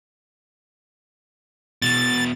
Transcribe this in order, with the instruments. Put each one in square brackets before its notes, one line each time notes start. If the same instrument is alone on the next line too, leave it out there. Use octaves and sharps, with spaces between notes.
[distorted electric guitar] E2 B2 [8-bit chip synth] A6